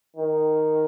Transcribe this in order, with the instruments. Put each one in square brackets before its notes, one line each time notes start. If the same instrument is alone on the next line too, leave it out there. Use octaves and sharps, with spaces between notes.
[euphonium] D#3